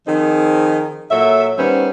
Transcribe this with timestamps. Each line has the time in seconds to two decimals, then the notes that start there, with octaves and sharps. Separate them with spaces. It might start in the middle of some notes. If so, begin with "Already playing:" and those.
0.07 D#3 F3 C4 D#4 G#4
1.10 A#2 F#3 A4 E5
1.58 D#3 G3 B3 C#4 C5